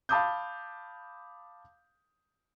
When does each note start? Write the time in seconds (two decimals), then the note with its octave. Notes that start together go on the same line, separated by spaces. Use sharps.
0.09 F5 A5 B5 D6 D#6 G6